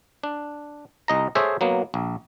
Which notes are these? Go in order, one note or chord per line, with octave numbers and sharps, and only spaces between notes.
D4
C2 D#5 A#5
G#4 A4 C5 C#5 E5
F#3 A#3 B3
A#1